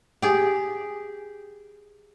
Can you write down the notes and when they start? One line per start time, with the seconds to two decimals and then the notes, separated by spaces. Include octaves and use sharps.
0.22 G4 G#4